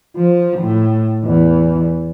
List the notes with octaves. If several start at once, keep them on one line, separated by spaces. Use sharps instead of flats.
F3
A2
E2